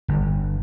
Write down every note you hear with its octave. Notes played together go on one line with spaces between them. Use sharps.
G1